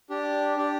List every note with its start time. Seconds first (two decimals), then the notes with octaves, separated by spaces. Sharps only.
0.10 D4 G4 D5
0.57 D4 G4 D5